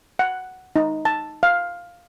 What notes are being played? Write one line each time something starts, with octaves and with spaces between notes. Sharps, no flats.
F#5
D#4
A5
F5